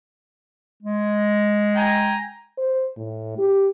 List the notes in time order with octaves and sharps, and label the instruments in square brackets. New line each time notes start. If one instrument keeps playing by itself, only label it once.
[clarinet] G#3
[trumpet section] G5 G#5 A#5
[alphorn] C5
A2
G4